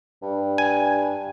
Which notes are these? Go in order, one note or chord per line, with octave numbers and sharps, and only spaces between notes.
G2
G#5